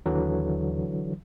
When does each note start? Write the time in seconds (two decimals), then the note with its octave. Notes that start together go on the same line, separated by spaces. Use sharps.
0.06 D#2 D3 E3 F#3